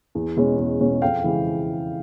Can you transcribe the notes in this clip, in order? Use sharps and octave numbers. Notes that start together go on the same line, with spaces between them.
E2
B2 G#3 C#4
E2
B2 G#3 C#4
F2 F5 G5
C#3 E3 G#3 C4